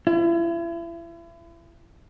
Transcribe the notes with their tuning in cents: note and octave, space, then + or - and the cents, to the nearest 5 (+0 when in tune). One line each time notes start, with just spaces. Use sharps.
E4 +35